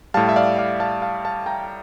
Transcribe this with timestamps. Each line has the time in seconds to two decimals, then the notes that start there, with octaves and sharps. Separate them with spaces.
0.14 A2 G3 F5 A5
0.29 E5
0.36 D5 F5
0.58 D5 F5
0.80 F5 A5
1.02 F5 A5
1.25 F5 A5
1.46 G5 A#5